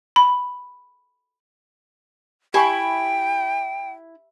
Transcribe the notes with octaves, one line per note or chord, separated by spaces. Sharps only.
B5
E4 G4 G5 G#5 C#6